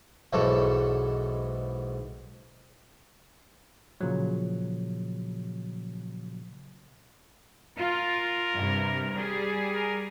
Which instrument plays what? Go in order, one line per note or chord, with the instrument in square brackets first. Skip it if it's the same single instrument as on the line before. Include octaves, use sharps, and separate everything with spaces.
[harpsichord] B1 G#2 E3 A4 C#5 D5
[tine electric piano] A#2 C#3 F3 F#3
[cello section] F4 [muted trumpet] A#4
[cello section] G2 C3
G3 G#4
[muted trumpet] A#4